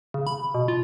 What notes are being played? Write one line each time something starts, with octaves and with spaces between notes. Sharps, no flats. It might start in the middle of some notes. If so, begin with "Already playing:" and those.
C#3
B5
B2
F4